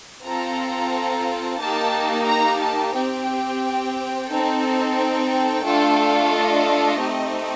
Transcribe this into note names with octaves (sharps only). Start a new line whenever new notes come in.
C4 F4 A4 A#5
A#3 D#4 G4 A5
A#5
A5
C4 G4 G5
C4 D#4 A4
G5
A3 D4 F4 A4
D#5
A3 C4 D#4 G4